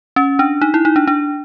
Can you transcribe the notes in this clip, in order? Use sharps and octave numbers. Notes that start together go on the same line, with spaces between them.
C#4
D4
D#4
E4
D#4
D4
D4